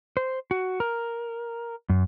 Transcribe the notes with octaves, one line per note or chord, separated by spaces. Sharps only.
C5
F#4
A#4
F#2